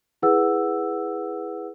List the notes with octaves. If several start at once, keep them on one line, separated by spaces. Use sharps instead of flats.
E4 G#4 B4 F#5 E6